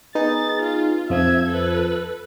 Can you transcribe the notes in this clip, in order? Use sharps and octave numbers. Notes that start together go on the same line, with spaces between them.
B3 D#4 G#4 A6
F4
F2 F3 E5 G#6
A4 B4